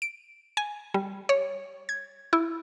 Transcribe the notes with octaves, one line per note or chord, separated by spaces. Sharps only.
D7
G#5
G3
C#5
G#6
E4